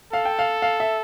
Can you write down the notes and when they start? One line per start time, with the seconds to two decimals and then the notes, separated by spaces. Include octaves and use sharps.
0.13 A4 F5
0.25 G5
0.39 F5
0.62 F5
0.80 E5